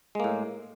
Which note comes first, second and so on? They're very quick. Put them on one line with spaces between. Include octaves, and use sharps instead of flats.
G#3 A#3 A2